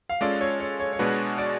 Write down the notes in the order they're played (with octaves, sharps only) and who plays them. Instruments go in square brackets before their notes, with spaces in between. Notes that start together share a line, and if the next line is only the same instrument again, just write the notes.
[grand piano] F5
[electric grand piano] G#3 C#4 F4 A4 [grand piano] D5
[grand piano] C#5
C#5
C#5
C#5
[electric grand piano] B2 G#3 D4 F#4 [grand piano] B4
[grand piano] D5